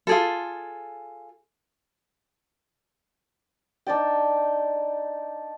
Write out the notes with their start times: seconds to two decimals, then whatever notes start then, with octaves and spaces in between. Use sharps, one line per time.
0.07 F4 G#4 A4
3.87 D4 D#4 D5 G5